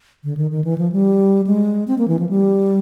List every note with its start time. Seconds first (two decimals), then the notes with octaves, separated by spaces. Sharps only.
0.24 D3
0.37 D#3
0.51 D#3
0.64 E3
0.78 F3
0.92 G3
1.47 G#3
1.88 C4
1.98 A#3
2.08 E3
2.19 F3
2.29 G3